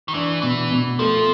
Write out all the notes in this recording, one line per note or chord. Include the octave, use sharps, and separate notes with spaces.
D#3
E3 D4
B2 E3
B2
F3 A3